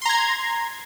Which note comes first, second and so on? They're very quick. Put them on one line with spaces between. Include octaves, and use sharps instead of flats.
C6 A#5 G#6